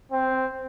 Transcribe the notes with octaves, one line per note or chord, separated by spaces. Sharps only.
C4